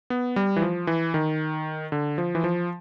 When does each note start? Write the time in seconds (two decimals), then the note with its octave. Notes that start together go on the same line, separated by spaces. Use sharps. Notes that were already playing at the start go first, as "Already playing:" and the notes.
0.10 B3
0.36 G3
0.56 E3
0.62 F3
0.87 E3
1.14 D#3
1.92 D3
2.18 F3
2.35 E3
2.44 F3